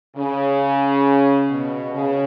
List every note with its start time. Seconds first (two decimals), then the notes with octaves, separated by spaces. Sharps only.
0.16 C#3
1.50 B2
1.93 C#3